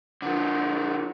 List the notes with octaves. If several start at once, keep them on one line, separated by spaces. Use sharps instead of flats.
D3 F3